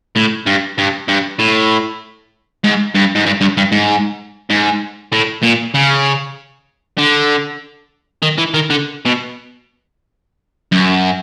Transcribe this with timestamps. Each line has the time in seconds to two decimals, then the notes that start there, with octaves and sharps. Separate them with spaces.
0.16 A2
0.46 G2
0.78 G2
1.08 G2
1.39 A2
2.64 G#2
2.95 G2
3.15 G#2
3.26 G2
3.41 G2
3.57 G2
3.72 G#2
4.50 G#2
5.12 A2
5.43 A#2
5.74 C#3
6.98 D3
8.22 D#3
8.38 E3
8.54 D#3
8.70 D3
9.05 B2
10.72 F#2